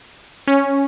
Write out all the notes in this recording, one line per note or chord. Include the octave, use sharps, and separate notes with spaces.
C#4